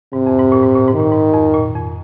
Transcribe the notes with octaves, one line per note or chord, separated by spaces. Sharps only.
G#2 C3
F2
G#2
A#2
G#2
A#2
G#2
D#3
A#2
G#2
F2
A#2
F2